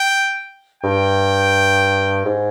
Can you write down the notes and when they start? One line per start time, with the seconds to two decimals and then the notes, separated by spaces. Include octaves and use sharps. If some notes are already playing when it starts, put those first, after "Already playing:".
Already playing: G5
0.83 G2 G5
2.25 G#2